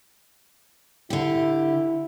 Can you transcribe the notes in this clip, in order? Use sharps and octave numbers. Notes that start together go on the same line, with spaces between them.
D3 E4 G4